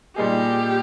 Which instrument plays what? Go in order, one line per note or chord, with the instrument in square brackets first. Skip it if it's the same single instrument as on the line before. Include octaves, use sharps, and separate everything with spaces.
[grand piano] A#2 G3 A#3 D#4 G#4 [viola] G4